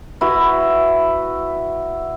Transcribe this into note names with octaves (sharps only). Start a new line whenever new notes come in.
E4 F#4 B4